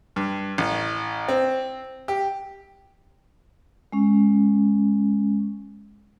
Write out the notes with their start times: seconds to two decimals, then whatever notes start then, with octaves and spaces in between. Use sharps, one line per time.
0.16 G2
0.58 A1
1.28 C4
2.08 G4
3.92 G#3 C#4